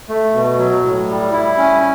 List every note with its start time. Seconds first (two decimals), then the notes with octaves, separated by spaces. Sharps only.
0.09 A3
0.34 B2
0.58 F#3
0.83 A2
1.09 G3
1.32 E4
1.58 C#4